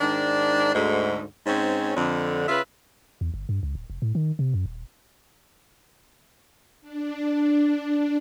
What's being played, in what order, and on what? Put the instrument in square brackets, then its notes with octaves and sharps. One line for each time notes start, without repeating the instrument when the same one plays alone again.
[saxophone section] G#2 D#3 D4
D2 G#2
G#2 C4 C#4
F2 D3
C#3 F4 B4 E5
[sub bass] E2
G1
G2
C#2
D1
F1
A2
D#3
C3
F#2
D#1
[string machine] D4